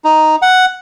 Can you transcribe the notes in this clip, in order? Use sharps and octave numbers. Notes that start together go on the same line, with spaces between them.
D#4
F#5